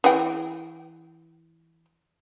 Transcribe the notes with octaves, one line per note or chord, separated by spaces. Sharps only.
E3 G#4 G5